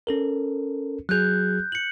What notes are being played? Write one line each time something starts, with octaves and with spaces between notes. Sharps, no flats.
C#4 A4 A#4
F#3 F#4 G#4 F#6 G6
C#7 F#7